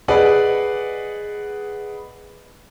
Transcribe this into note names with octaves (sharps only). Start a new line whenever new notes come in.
G#4 B4 D5 D#5 F#5